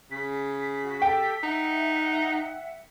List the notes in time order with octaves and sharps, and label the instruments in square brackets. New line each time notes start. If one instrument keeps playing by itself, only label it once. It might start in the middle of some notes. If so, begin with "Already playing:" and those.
[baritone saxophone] C#3 [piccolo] B6
[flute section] F#4
[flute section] G4 A4 [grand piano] G5
[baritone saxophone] D#4 [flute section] E5 F#5